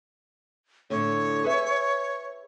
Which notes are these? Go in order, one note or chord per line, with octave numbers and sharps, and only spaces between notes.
A2 D3 C#5
G#4 B4 E5